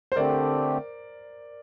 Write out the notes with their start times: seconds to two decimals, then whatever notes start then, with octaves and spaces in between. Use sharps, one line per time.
0.12 C5
0.16 D3 A3 C4 G4 A#4 D5